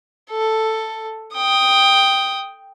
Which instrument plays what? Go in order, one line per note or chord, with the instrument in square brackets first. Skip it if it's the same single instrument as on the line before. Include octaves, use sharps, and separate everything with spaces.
[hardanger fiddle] A4
G5 D#6